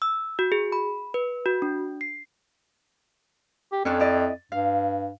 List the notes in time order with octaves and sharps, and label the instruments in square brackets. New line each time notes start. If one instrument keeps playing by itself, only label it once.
[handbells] E6
F#4
G#4
B5
B4
F#4
D4
C7
[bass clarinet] G4
[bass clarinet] F2 [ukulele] C#4 D4 A4
[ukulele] E4 D5 D#5
[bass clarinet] G2 [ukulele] F5